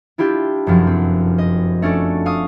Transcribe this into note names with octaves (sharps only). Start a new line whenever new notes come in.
D4 E4 F4 G4
F1 F#2 F3
C4
D#5
A3 C#4 D4 A4 D5
F5 C#6 D#6